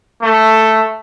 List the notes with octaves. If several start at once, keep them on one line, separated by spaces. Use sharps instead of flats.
A3